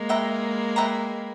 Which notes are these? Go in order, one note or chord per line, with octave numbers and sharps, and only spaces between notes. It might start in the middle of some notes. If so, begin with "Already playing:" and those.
Already playing: G#3 A#3
B4 E5 G5 A#5
B4 E5 G5 A#5